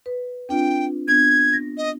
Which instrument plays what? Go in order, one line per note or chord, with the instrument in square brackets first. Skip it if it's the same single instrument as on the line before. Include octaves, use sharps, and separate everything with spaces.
[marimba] B4
[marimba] C4 D4 F4 [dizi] G5
[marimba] B3 D4 [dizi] G#6
[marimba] A#6
[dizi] D#5